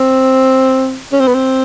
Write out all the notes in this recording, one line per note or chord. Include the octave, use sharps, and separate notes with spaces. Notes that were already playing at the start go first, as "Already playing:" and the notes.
Already playing: C4
C#4
C4
B3
C4